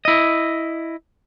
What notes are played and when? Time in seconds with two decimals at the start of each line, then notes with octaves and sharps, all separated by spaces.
0.05 E4 D#5